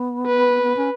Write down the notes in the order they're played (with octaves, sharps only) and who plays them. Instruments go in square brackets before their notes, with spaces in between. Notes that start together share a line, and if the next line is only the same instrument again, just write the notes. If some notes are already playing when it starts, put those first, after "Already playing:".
Already playing: [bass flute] B3
[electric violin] B4
[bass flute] B3
C#4